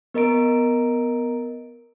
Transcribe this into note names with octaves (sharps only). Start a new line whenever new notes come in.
B3 A#4 D#5 A#5 D7